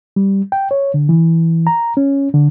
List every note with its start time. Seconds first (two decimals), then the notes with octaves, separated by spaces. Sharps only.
0.16 G3
0.52 G5
0.71 C#5
0.94 D3
1.09 E3
1.67 A#5
1.97 C#4
2.34 D3